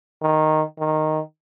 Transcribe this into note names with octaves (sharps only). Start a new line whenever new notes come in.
D#3
D#3